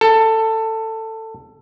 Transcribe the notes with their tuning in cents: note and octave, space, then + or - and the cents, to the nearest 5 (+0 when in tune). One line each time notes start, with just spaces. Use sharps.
A4 +15